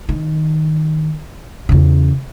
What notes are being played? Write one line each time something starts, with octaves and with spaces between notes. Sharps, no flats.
D#3
E2 C#3